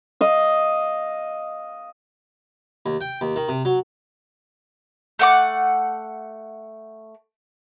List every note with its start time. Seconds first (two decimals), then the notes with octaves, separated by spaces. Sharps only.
0.21 D#5 F5
2.86 D#2
3.01 G5
3.21 D#2
3.36 D#3
3.49 C3
3.65 F#3
5.19 A3 F#5 D6